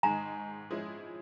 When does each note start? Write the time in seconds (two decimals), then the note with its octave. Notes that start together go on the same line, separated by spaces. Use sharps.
0.03 G#2 D#3 G#3 G#5 A#5
0.70 F3 G#3 C#4 E4 G#4